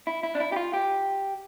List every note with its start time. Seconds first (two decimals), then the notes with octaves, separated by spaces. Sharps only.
0.07 E4
0.23 E4
0.35 D4
0.40 E4
0.52 G4
0.56 F4
0.73 G4